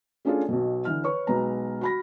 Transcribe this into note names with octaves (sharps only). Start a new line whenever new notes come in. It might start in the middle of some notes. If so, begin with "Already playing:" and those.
A3 C#4 D4 F4 G#4 A4
B1 B2
D3 E3 F6
B4 C#5 C#6
B1 G#3 B4 A#5
F#4 B5 A#6